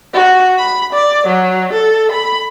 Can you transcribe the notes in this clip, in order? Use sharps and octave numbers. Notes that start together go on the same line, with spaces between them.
F#4
B5
D5
F#3
A4
B5